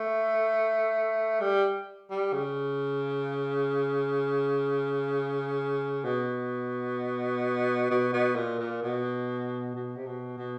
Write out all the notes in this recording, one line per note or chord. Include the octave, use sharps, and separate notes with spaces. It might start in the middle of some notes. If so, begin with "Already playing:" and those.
Already playing: A3
G3
G3
C#3
B2
B2
B2
A#2
A#2
B2
B2
C3
B2
B2